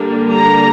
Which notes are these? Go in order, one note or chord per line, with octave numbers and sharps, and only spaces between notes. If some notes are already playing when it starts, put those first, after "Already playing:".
Already playing: D3 G3 A#3 D4
A#5